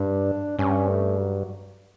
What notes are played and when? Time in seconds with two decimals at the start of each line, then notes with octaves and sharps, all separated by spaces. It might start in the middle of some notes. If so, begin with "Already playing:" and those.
Already playing: G2 D4
0.59 G2 C#4
0.88 A3
1.19 F#3